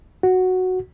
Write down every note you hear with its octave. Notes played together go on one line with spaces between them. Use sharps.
F#4